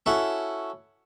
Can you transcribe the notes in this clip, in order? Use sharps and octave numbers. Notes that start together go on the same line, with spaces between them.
C#4 E4 F#4 A4